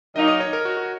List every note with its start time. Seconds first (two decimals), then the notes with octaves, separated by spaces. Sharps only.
0.15 D#3 F#3 A#3 D#4 D#5
0.28 D#5
0.40 C#5
0.53 A#4
0.65 F#4
0.77 F#4